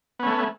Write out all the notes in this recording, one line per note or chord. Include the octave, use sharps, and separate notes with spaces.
A3 B3 C#4